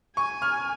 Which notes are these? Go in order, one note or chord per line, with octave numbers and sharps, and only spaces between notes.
G#5 C#6
F6